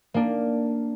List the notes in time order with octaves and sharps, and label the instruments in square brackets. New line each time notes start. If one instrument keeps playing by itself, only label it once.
[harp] A#3 D4